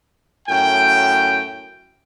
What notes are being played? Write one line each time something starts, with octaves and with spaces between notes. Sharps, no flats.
F#2 A2 G5